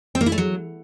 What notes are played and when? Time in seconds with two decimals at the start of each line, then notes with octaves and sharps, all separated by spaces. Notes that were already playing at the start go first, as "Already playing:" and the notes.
0.15 C4
0.21 A#3
0.26 E4
0.32 A3
0.38 F#3